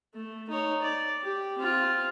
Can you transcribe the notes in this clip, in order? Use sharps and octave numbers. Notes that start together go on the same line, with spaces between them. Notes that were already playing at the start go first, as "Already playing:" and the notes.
A3
D#4 C#5
D5
G4
C4 F4